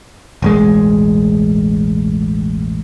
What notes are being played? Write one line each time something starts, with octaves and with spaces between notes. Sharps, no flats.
E1 A1 G#3